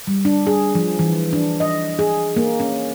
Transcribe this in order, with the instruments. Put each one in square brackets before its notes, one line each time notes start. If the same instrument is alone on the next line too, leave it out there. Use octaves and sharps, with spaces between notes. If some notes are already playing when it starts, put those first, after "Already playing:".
[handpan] G3
D4
G#4
F3
E3
D4
D#5
G#4
A#3
C#4